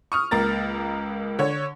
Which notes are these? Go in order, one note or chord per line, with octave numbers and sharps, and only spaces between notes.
C#6 D#6 F6
C#2 A#3 A#5 A6
D3 C#5